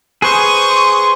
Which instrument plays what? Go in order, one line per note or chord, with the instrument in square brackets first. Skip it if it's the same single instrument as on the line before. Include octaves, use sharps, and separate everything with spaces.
[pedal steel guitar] G#4 B4 C5 [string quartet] C#6 D#6
[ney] C6